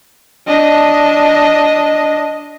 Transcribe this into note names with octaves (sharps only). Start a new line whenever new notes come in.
D4 D#5